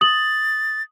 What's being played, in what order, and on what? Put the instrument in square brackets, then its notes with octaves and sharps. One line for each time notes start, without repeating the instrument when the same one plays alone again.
[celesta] D#6 F#7 [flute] A6